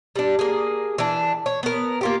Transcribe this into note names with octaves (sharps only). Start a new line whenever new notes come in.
G3 D4
A#3 G#4
E3 D4
C#5
B3 A#4
A#3 F4 G4